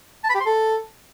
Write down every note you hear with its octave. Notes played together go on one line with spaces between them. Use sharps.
A5
B5
G4
C6
A4